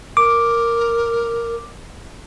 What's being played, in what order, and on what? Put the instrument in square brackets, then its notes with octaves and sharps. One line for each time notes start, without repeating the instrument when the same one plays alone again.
[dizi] A#4 [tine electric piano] D6